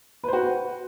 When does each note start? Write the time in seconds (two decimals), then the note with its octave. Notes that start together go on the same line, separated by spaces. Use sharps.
0.24 B4
0.28 C5
0.33 F#4